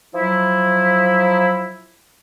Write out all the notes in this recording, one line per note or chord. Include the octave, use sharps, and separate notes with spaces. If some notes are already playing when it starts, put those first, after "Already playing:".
F3 F#3 E4